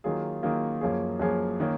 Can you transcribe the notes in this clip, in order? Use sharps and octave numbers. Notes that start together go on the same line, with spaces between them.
D#3 F#3 A#3 F4 G#4
D#3 F#3 A#3 F4 G#4
F#2 F3 A#3 C#4 G#4
F#2 F3 A#3 C#4 G#4
D#3 A#3 C#4